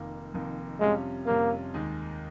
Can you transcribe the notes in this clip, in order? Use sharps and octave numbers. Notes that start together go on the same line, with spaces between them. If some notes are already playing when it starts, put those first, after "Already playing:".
Already playing: F1 F2 D#3 A#3
F1 F2 D#3 A#3
F2 C3 G3 G#3 C#4 F4
F2 C3 G3 A#3 C#4 F4
D#2 D#3 G#3